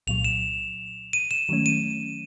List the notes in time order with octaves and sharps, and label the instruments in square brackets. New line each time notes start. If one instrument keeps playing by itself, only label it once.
[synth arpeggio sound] C2 A#2 F#3 [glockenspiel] F7
[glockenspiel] E7
D#7
E7
[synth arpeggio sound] D#3 F#3 A3 C#4
[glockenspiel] D#7